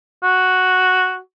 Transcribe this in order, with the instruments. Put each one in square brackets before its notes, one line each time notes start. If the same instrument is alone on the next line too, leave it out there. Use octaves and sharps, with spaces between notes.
[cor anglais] F#4